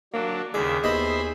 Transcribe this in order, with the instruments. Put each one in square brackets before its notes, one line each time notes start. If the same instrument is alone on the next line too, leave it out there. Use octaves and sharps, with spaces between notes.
[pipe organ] F#3 D4 [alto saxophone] A#3
[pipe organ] D#2 C#3 E5 [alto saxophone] G#4 [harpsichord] D5
[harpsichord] D#2 B3 D#5 [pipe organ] C5 E5 B5